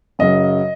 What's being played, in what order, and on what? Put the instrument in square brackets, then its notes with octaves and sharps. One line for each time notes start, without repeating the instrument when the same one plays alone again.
[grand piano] F#2 C#3 F#3 D#5